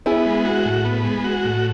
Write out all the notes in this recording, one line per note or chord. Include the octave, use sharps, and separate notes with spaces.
B3 E4 G#4
G#3
F#4
A2
B3
G#3
F#4
A2